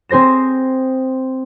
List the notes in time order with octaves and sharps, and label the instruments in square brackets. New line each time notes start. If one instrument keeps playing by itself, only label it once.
[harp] C4 G#4 C5 A#6 E7